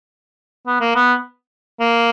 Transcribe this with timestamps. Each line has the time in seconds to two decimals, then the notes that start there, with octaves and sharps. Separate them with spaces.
0.67 B3
0.80 A#3
0.95 B3
1.80 A#3